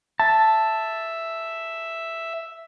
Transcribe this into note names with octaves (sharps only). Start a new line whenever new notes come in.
E5 A5